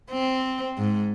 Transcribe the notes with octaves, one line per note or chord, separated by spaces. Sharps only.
C4
G#2